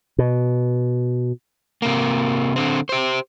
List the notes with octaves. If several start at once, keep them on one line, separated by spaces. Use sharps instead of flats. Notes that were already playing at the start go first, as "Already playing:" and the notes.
B2
C3 A#3
D3 C4
G4 C5